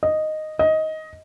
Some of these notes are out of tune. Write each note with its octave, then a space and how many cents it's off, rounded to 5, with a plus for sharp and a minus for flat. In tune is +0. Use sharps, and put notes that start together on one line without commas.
D#5 -5
D#5 +15